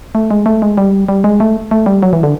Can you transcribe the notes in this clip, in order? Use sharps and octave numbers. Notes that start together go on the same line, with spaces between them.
A3
G#3
A3
G#3
G3
G3
G#3
A3
A3
G3
F#3
E3
D3